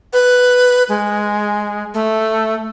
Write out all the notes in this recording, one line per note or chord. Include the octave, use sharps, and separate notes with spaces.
B4
G#3
A3